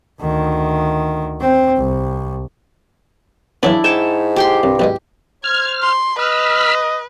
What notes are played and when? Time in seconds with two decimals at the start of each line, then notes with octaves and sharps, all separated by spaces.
0.21 D2 D#3
1.41 C4
1.77 C2
3.63 C#3 E3 F#3 B3 D4 E4 D5
3.84 G#2 C#5 G5 A5
4.36 G4 G5 C6
4.63 C2 G2
4.79 B1 B2 G#3 G4
5.44 C5 F6 G#6
5.82 C6
6.19 B4 D#5 B5 E6 F6